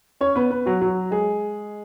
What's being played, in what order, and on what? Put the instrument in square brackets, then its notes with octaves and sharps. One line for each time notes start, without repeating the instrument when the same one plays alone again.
[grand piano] C#4 C#5
B3 B4
B3 B4
F#3 F#4
F#3 F#4
G#3 G#4